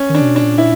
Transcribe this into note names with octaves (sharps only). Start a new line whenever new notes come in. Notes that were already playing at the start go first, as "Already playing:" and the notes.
Already playing: C#4
D#3
D4
C3
B2
D4
A#2
E4